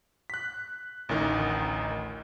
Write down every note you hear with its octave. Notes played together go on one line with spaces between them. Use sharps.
F#6 B6
A1 D2 D#3 D#4